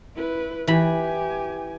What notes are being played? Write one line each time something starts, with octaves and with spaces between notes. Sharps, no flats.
E4 B4
E3 G4 G#5 B5